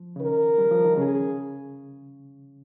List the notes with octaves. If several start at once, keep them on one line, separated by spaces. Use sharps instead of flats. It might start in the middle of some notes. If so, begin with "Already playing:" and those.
Already playing: F3
C#3
D#3 A#4
G3
F3
D#3
C#3 G#4